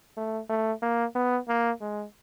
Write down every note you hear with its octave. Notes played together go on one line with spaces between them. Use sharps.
A3
A3
A#3
B3
A#3
G#3